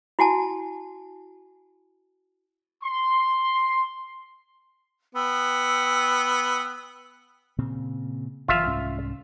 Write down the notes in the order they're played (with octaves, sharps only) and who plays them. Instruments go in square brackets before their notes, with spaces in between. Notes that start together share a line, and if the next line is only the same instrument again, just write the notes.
[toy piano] E4 F#4 G#5 A5
[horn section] C6
[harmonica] B3 [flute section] G5 E6
[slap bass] A#2 C#3 C4
[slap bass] F#1 C#3 E3 [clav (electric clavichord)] F4 E5 F5
[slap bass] C2 G#2 C#4